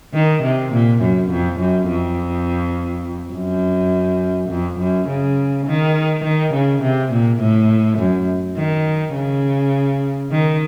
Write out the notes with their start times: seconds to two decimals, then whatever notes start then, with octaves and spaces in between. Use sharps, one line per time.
0.14 D#3
0.43 C3
0.73 A#2
1.01 F#2
1.30 F2
1.60 F#2
1.88 F2
3.33 F#2
4.49 F2
4.79 F#2
5.08 C#3
5.66 D#3
6.24 D#3
6.53 C#3
6.82 C3
7.11 A#2
7.40 A2
7.98 F#2
8.57 D#3
9.14 C#3
10.31 D#3